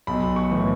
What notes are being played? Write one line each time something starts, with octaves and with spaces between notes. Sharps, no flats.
B1 B5
C#6
A2 E3